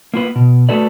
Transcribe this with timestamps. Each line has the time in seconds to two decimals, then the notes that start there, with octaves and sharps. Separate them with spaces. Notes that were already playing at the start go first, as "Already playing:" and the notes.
0.14 A#3 F4 B4
0.36 B2
0.69 A3 F#4 A4 B4 D5